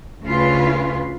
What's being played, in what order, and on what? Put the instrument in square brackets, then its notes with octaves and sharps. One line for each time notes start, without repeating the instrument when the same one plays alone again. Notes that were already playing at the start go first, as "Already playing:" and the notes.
[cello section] D2 C#3 F4 B4